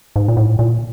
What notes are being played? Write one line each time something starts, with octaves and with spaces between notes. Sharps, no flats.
G#2
A#2
A2
A#2